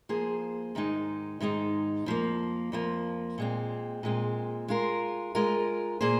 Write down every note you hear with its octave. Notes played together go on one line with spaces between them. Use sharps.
F3 A#3 G#4 C5
G#2 D#3 G#3 D#4
G#2 D#3 G#3 D#4
F2 F3 A#3
F2 F3 A#3
A#2 G#3 C4
A#2 G#3 C4
G#3 F4 A#4
G#3 F4 A#4
A#2 A#3 G#4 C5